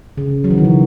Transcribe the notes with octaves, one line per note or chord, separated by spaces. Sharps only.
C#3
F#3
E3
D#3
C#3